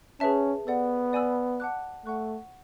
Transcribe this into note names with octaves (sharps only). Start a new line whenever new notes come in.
C#4 G#4 B4 E5 A5
B3 A4 D5 F#5
D5 G#5 B5 E6
F#5 A5 D6 F#6
A3 F#5 C#6 F#6